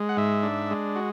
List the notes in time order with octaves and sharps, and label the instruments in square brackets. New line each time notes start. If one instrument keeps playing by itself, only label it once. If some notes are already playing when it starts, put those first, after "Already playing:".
Already playing: [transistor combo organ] G#3
F#5
G#2 E5
D4
G#3
F#4